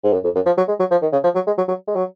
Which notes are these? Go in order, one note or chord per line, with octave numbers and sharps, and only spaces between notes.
G#2
F#2
F2
F#2
F3
F#3
G#3
F#3
F3
D#3
C#3
F3
F#3
G#3
F#3
F#3
G#3
F#3